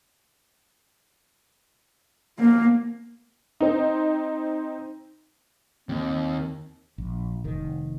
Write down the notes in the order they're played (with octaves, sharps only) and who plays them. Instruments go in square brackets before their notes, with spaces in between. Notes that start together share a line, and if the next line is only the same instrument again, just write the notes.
[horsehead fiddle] A#3
[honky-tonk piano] C4 D#4
[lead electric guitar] D#2 [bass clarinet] C4
[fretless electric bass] A#1
F1 D#3